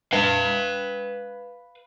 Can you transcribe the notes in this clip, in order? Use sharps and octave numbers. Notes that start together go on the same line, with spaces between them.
B4 F5